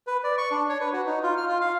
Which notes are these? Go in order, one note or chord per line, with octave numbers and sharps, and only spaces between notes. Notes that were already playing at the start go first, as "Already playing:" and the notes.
B4
D5
C#6
D4
C#5
B4
F#4
D#4
F4
F6
F4
F5